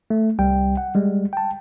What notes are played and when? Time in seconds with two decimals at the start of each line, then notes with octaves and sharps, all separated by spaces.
0.10 A3
0.39 C2 G3 G5
0.77 F#5
0.95 G3 G#3
1.33 G5 A5